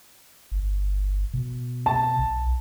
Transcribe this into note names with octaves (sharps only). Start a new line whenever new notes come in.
G1
B2
A5
B1